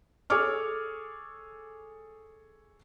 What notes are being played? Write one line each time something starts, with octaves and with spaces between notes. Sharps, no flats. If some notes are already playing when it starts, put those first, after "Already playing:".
G#4 A4 C#5 C#6 D6 F6